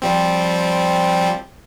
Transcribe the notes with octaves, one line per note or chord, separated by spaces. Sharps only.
F3 G3 C4